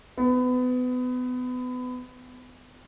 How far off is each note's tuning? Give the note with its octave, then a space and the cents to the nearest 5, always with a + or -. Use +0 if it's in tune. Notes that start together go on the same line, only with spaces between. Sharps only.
B3 +25